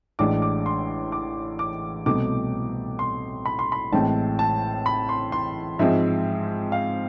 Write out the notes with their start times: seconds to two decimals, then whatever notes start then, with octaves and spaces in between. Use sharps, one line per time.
0.19 A1 A2 G#3 D4 D6
0.42 D6
0.66 C6
1.12 D6
1.59 D6
2.06 C2 B2 A3 C4 D6
2.99 C6
3.46 B5
3.59 C6
3.72 B5
3.92 A1 A2 G#3 C4 A5
4.39 A5
4.86 B5
5.09 C6
5.32 C6
5.79 G#2 F3 G#3 C4 E5
6.72 F5